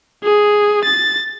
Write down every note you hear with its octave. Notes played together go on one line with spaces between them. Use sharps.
G#4
A6